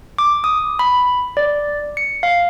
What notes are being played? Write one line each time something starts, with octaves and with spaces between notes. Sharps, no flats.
D6
D#6
B5
D5
C#7
F5